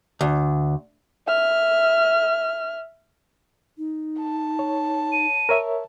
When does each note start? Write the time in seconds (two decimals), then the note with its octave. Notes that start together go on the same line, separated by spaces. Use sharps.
0.21 D2
1.27 E5 F6
3.78 D#4
4.21 A5
4.59 C#5
5.12 D#7
5.49 A#4 C#5 E5